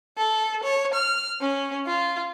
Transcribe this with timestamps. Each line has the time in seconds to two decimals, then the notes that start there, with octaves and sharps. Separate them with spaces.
0.17 A4
0.63 C#5
0.94 F6
1.40 C#4
1.87 F4